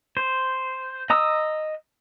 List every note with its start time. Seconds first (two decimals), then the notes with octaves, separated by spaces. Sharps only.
0.17 C5
1.10 D#5 A#5 D#6 E6